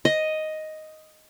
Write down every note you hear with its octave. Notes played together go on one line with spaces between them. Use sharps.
D#5